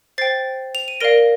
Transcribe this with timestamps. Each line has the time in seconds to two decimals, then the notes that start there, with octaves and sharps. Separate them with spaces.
0.18 C5 G5 A6 C7
0.75 F7
0.88 D#7
1.00 A#4 D5 F5 A#6 D7